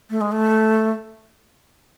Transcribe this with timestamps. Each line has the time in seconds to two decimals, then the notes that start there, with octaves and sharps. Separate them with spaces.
0.10 A3
0.21 G#3
0.32 A3